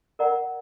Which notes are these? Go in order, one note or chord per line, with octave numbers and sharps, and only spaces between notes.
A#4 D5 F#5 A#5